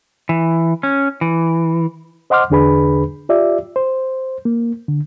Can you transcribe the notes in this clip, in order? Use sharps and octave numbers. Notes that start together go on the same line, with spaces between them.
E3
C#4
E3
C5 D#5 F#5 C6 D6 F6
E2 D3 D4 G#4 B4 B5
F4 G4 D5 E5
C5
A#3
D3